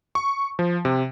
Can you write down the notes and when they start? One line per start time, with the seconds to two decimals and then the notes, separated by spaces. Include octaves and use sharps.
0.15 C#6
0.59 F3
0.85 C3